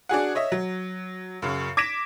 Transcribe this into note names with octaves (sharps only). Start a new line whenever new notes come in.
D4 F#4 G#4 F#5
C#5 D#5 E5
F#3
F#2 C#3
D6 G#6 A#6 B6 D7 E7